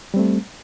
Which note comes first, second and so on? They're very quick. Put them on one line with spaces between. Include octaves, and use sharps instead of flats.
G3 C4 A3